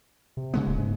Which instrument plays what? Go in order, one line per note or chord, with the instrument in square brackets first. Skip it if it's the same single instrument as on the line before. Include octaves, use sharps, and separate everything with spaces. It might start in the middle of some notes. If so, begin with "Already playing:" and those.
[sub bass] C3
[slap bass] C#3 G#3 B3
[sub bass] D1
G#2